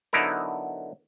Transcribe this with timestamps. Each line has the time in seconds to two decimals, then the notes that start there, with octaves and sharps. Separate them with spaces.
0.13 D3 F#3 B3 D#4 E4 A#4